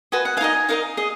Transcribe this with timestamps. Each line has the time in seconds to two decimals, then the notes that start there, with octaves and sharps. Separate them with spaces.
0.12 F#4 B4 D#5 G#5
0.25 F#5
0.37 F5 G#5
0.41 D#4 A#4 D#5
0.69 D#4 A#4 D#5 F5
0.97 G#4 D#5